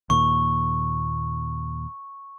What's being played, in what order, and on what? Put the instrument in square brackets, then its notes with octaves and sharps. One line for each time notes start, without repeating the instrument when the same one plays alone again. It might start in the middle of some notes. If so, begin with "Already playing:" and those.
[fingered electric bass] D#2 A#2 [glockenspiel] C#6